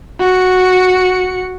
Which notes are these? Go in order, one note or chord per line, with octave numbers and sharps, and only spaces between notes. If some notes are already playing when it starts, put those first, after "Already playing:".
F#4 C#7